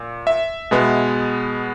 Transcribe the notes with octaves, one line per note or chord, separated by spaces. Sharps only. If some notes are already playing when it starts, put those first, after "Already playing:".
Already playing: A#2
E5
B2 G#3 B3